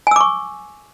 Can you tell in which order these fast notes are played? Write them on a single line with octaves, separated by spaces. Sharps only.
G#5 E6 D6 C#6